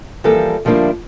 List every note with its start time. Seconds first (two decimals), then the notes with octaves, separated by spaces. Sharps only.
0.24 E3 F3 G3 A#3 A4
0.65 D2 F3 G3 A#3 D4 E4